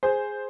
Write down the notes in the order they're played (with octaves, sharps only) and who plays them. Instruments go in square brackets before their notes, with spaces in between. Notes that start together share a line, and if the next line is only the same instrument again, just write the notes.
[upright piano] G#4 C5